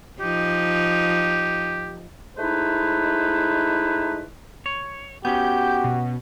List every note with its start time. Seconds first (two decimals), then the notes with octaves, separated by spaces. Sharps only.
0.20 F3 D#4 G4
2.37 G#3 A3 D#4 E4 B4 C5
4.66 C#5
5.25 B3 C#4 F#4 G4 G6
5.84 B2